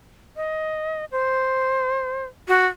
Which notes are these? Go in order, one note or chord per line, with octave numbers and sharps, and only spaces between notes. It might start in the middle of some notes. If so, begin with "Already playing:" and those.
D#5
C5
F#4